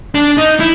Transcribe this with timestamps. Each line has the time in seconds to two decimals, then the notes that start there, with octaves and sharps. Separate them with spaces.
0.15 D4
0.37 D#4
0.60 E4